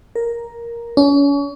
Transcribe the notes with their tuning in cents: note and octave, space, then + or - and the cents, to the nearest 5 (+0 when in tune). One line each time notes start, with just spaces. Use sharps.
A#4 +5
C#4 +35